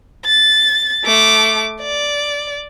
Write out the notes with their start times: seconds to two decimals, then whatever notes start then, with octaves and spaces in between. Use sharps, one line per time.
0.26 A6
1.05 A3 D6
1.82 D5